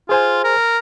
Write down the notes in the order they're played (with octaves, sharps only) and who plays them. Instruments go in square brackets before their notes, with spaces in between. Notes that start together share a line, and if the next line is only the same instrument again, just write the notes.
[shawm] F4 [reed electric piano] G#4 C5 G#5
[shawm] A#4